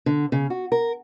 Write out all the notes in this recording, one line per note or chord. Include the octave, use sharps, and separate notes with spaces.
D3
C#3
F#4
A#4